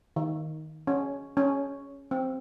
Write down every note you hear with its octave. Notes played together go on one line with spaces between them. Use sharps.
D#3
C#4
C#4
C4